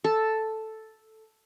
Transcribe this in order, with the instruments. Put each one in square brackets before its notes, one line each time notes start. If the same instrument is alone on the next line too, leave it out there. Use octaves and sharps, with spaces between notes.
[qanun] A4